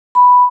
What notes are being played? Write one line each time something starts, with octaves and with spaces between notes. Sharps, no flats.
B5